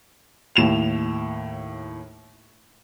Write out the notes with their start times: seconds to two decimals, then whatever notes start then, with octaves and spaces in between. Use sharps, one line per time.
0.56 D#2 A2 E7 F7